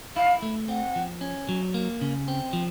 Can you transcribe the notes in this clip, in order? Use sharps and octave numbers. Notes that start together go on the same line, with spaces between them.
E4 F5
A3
C4 F#5
F3
C#4
F#3
A#3
C#3
C4
F3